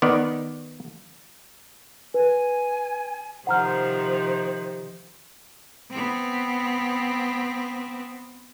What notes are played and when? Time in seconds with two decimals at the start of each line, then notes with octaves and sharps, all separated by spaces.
0.02 D#3 B3 D5
2.14 B4 G#5
3.47 C3 D#3 F3 C5 F#5 A#5 F6
5.91 B3 C4